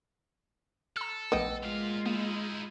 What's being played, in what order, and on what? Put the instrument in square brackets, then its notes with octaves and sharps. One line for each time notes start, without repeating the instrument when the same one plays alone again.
[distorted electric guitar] A4 [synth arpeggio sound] A#5 E6
[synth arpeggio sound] A#1 A3 [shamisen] B3 D#5 G5
[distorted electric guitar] A#2 F5 [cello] G#3 F4
[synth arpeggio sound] A#3 [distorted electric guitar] D#4 E4